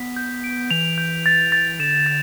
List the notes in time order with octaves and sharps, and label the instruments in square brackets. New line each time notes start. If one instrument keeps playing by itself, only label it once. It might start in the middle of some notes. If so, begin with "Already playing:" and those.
Already playing: [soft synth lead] B3 [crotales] B6
[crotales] G6
D7
[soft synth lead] E3 [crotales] F7
[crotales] G6
A6
A6
[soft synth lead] D3 [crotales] E7
[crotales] A6